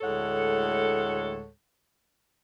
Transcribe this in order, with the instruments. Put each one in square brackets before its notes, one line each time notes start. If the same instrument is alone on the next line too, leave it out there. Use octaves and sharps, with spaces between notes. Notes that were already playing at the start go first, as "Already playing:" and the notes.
[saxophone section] D2 A2 G#3 A4 C#5 F#5